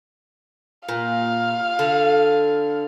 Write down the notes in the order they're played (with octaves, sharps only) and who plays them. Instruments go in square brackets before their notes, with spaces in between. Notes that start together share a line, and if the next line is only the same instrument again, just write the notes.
[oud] A#2 [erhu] F5
[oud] D3